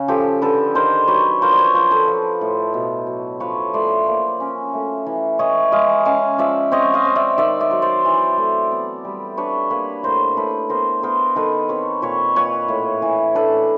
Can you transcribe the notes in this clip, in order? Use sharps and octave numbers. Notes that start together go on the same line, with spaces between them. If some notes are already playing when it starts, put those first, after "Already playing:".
Already playing: C#3
F3 G4 A4
D3 A4 B4
D#3 A#4 C5
F#3 B4 C#5
F3 A#4 C5
D5
B4 C#5
F3 A#4 C5
A4 B4
F3
A2
B2
F#3
F3 B4 C#5
A3 C5 D5
A#3
C#4
A3
E3
E3 C#5 D#5
G#3 D#5 F5
C#4 D#5 F5
F3 D5 E5
C4 C#5 D#5
D#5 F5
C4
D5 E5
D#3 D5 E5
D5 E5
F#3
C5 D5
E3
A3
B3
G3
D4 B4 C#5
A#3 B4 C#5
A2 A#4 C5
A2 A4 B4
B3 A#4 C5
B3 A#4 C5
D#3 A4 B4
C4 B4 C#5
A#2 B4 C#5
A#2 B4 C#5
A2
E3
D4 A4 B4